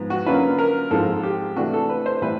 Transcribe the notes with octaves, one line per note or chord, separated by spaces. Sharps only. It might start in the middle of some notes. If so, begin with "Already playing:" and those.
Already playing: G#2 F3 B3
F#4
D3 F#3 A#3 C#4 F4 B4
A#4
G#2 F3 G#3 C4 F4 A4
G4
C3 E3 A3 D4 F#4
A4
B4
C5
A2 E3 G3 C4 B4